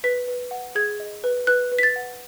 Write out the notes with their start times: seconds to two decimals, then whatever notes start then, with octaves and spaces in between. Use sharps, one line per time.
0.04 B4 B6
0.28 B4
0.51 F#5
0.75 G#4 G#6
1.00 D#5
1.24 B4
1.47 B4 F#6
1.72 B4
1.79 B6
1.83 A6
1.96 F#5